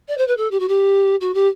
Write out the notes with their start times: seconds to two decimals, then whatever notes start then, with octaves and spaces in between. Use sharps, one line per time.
0.08 D5
0.18 C5
0.27 B4
0.37 A4
0.51 G4
0.59 F#4
0.68 G4
1.21 F#4
1.34 G4